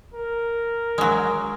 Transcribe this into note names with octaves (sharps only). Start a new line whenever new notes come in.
A#4
F#3 G#3